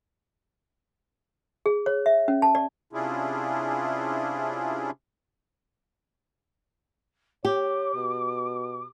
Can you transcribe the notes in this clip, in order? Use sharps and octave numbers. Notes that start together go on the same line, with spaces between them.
G#4
C#5
E5
C#4
A5
D5
C3 C#4 D4 E4 F4 G#4
G4 C#5 D6
B2